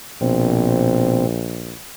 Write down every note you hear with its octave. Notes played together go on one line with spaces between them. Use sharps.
A#1 B2 C4